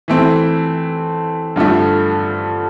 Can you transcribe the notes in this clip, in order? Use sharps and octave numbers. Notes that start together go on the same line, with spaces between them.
E3 A3 C4
G2 D3 F3 A3